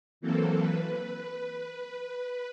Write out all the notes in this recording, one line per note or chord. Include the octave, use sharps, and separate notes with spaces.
E3 F#3 A#3 C4 A4
B4